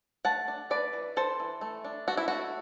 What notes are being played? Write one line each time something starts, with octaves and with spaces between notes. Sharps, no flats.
A3 F#5 A5
D4
A3 B4 D5
E3
E3 A4 C5
E3
A3
D4
A3 F#4
E4
A3 F#4